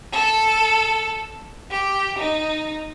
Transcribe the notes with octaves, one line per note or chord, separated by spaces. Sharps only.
A4
G4
D#4